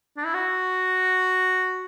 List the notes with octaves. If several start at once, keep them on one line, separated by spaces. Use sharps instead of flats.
D4
E4
F#4